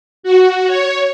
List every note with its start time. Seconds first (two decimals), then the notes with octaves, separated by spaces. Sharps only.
0.23 F#4
0.67 C#5